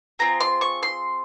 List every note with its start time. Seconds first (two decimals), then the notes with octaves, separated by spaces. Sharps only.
0.19 C4 F4 G#4 A#5
0.40 C6
0.61 C#6
0.83 C6